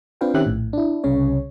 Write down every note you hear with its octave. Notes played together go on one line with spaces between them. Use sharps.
C4 D4 F4 B4 F5 G5
D#3 C4 C#4 G4 E5 F#6
A#1 A2
D4 E4
C2 C#3 C#4 C#5